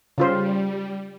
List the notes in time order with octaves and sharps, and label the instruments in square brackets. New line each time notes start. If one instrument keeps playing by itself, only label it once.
[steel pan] C#3 F4 C5 [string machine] G3